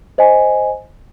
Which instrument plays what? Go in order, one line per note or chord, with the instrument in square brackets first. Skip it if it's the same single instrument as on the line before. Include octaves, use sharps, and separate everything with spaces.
[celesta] C5 D#5 G#5